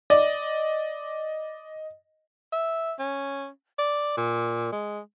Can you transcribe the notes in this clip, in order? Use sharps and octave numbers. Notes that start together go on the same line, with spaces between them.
D5 D#5
E5
C#4
D5
A#2
G#3